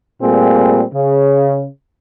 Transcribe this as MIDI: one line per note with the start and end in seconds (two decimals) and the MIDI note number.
0.22 0.82 46
0.22 0.82 55
0.22 0.82 57
0.22 0.82 58
0.22 0.82 60
0.22 0.82 68
0.94 1.65 49